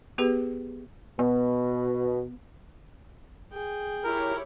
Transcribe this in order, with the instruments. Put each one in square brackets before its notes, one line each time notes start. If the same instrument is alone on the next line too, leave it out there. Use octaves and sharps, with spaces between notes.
[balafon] B3 G4 G#4 B4
[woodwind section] B2 [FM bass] B3
[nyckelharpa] G#4 G5
[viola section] E4 G4 C#5 [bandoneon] A#4